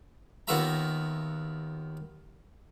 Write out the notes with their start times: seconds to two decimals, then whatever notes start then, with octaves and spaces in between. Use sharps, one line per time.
0.48 D#2 B3 F4 F#4 E5 A#5